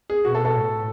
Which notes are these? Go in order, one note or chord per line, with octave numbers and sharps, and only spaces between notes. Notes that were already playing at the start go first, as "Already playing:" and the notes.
G#4
B2 F#4
A4
A4
A2